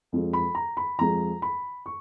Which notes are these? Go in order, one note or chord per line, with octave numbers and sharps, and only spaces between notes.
F2 F3 G#3
B5
A#5
B5
F2 F3 G#3 A#5
B5
C#6